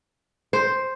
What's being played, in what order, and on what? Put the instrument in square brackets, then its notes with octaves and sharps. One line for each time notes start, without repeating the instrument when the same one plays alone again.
[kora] C5